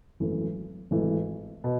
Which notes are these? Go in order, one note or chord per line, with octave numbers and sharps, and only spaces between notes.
G#1 F#2 E3 A3
G#1 G#2 E3 A3
B2